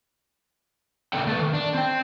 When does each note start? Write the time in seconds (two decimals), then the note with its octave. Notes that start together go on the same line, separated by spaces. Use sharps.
1.13 A2 C#3 C4 D4 A4 G5
1.27 A3 A4 B4
1.40 D#3
1.54 D4
1.74 C4 G5